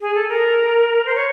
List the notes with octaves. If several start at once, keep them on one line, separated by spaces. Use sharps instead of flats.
G#4
A4
A#4
C5
C#5